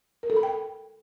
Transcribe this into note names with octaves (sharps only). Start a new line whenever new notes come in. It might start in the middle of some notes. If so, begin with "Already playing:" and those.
A#4
A4
B5
G5